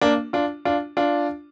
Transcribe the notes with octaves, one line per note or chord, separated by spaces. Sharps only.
A#3 D4
D4 F4
D4 F4
D4 F4